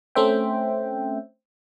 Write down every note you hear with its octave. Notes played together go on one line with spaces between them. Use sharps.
A3 C4 C#4 C5 E5 G5